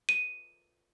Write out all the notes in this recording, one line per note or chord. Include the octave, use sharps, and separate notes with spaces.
D#7